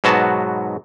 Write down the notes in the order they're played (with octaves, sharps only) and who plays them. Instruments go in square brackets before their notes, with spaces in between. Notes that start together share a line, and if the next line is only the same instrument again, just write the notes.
[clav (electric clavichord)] G#2 B2 F#3 B3 F#4 A5